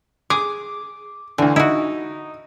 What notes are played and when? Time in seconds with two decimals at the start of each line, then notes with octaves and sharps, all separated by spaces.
0.30 G#4 D6
1.38 D2 D3 E3
1.56 D#4 E4 F#4